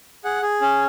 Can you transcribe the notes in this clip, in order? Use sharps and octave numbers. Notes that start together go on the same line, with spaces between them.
G#4 F#5
G#4
C#4